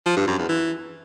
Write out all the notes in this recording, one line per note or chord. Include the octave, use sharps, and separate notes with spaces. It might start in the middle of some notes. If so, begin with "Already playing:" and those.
F3
G2
F#2
E2
E3